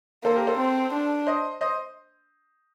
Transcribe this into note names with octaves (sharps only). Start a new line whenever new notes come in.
A#3 A4 C5
G4 A#4
A4 C5
C4
D4
C5 D#5
C5 D#5